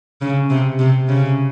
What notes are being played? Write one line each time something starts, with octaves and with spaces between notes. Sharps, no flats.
C#3
C3
C3
C#3